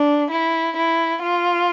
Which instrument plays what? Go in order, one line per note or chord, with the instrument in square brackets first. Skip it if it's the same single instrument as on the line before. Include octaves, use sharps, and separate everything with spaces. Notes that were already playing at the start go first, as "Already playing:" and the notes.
Already playing: [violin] D4
E4
E4
F4